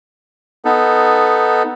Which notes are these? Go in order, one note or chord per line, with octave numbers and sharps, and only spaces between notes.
B3 D#4 A4